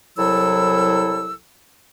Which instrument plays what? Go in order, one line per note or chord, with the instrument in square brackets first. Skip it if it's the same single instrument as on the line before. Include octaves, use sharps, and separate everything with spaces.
[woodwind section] C2 F#3 E4 A4 E6